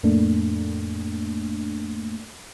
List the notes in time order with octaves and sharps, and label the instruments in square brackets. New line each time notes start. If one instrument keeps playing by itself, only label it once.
[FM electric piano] F2 A2 A3 A#3 D4